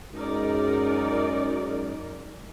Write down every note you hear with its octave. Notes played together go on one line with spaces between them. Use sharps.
F#2 G#3 D#4 A#4 D5